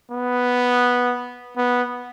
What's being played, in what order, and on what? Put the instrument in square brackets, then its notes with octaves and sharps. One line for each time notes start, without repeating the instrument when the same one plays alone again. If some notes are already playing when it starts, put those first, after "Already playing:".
[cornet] B3
B3